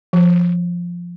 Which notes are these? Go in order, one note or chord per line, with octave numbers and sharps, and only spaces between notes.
F3